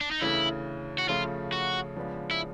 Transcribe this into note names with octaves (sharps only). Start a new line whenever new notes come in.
D4
D#4
D2 C#3 E3 E4
F#4
C#3 F3 A3 F4
F#4
C#3 F3 G#3 B3 D4
E4